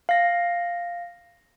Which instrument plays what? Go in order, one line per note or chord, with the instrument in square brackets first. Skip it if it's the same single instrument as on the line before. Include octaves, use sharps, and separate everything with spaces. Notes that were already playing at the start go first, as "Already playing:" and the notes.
[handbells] F5 A#6